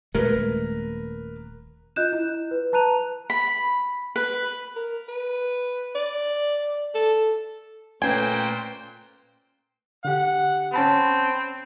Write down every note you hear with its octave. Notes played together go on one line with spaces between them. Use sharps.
D#1 G#3 A3 A#4 B4
F4 D#5 F#6 G6 E7
E4
B4
B4 A5 A#5 F#6 D#7 F7
B5
B4
A#4
B4
D5
A4
A#2 A3 C#4 B4 C5 G5 G#5
D3 G4 F#5
C4 C#4 A5 B5